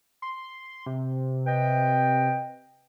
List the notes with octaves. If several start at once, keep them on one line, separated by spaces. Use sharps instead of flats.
C6
C3
B4 D#5 G5